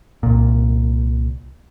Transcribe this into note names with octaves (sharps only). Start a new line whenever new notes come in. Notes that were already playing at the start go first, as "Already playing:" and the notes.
C2 A#2